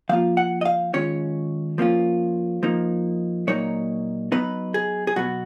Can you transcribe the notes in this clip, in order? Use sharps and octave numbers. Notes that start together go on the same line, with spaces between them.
F3 A#3 F4 F5
F#5
D#5
F5
D#3 G#3 C#4 F4 C#5
F3 A#3 C#4 F4
F3 A#3 D#4
A#2 F#3 A#3 D#4 C#5
F#3 B3 D#4 B4
G#4
G#4
B2 F#3 B3 F#4